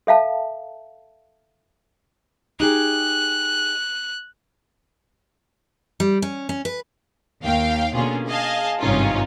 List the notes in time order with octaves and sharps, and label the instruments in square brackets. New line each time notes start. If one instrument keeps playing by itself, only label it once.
[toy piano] A4 E5 F5 A5
[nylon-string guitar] D#4 G4 G#4 [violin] F#6
[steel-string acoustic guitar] G3
C#4
C#4
B4
[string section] D#2 F5 G5
B2 D3 A#3 C#4 F4 G#4
G#4 D#5 F5 G#5 A5
G#1 G2 C3 C#4 D#4 F4